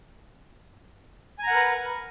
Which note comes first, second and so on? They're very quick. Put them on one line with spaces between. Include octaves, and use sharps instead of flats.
G#5 A#5 F#5 A#4 B4